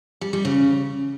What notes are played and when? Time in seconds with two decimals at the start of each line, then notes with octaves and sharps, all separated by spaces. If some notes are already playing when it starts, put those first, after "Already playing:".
0.21 G3
0.33 G3
0.45 C#3